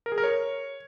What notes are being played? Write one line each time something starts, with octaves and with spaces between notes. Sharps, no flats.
A#4
G#4
A#4
C#5